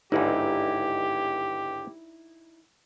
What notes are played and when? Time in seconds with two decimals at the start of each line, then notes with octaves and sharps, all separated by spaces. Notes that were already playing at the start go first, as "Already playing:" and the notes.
0.12 G1 C#2 G#2 D#4 E4 G4 D5